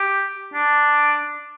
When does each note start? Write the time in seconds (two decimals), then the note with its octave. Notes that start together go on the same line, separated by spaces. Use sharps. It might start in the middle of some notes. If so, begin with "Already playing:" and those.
Already playing: G4
0.54 D4